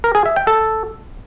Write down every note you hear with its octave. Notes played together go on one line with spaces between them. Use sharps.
A#4
G#4
E5
G5
A4